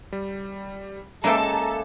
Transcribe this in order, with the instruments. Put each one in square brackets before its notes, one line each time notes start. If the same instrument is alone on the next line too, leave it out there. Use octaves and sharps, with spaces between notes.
[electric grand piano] G3
[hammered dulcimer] C#3 E5 D6 [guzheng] G#3 A#3 G5 [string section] A4 [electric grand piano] A#5